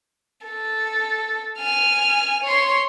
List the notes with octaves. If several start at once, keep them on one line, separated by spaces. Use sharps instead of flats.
A4
G#5 F6
C#5 C6